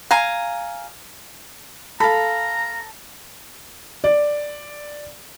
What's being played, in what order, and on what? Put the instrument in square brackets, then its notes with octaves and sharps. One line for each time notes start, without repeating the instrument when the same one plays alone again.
[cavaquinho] F5 G#5 A#5
[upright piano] A4 [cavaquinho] F5 B5 [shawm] A#5
[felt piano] D5